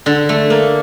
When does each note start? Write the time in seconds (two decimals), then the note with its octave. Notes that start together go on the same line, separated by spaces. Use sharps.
0.06 D3
0.29 A3
0.50 A#3